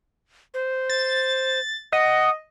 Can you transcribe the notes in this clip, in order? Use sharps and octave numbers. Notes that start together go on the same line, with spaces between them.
C5
A6
D#5 F#5